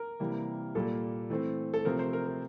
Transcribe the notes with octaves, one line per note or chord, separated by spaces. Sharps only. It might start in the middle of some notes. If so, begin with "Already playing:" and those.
Already playing: A#4
C3 E3 G3 A#3
A#2 G3 A#3 A4
E3 A3 C4
A4
C3 F3 A3 C4 A#4
C5
A#4
A#4